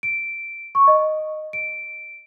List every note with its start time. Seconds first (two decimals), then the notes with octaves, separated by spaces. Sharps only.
0.03 D7
0.75 C#6
0.87 D#5
1.53 D7